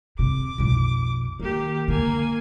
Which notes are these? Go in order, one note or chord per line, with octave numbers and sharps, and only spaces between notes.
C3 D6
B1 F2
D#3 A#3 G4
D3 G#3 A#3 G#5